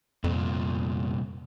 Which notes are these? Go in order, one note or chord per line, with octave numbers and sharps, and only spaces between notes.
C2 F2 A#2